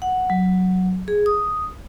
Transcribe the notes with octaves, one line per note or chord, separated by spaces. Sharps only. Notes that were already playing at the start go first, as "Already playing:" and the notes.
F#5
F#3
G#4
D#6